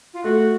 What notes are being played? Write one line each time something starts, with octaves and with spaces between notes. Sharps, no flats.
F4
A3 F#4